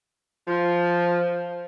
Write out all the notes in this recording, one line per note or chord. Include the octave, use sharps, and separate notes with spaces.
F3